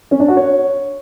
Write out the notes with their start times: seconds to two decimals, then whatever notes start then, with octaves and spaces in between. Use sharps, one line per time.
0.11 C#4
0.20 D4
0.28 F#4
0.37 C#5